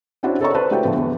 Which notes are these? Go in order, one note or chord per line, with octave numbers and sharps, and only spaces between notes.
C#4 D4 E4 F#4 C5 D5
A4 A#4 C#5 D#5 A#5 C#6
B4 C5 D5 A5
A3 E4 F#4 G4 G5
A2 D3 F3 B3
E2